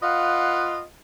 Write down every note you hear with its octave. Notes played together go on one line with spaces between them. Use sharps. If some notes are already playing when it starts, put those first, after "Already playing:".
F4 B4 D#5 F5 F#5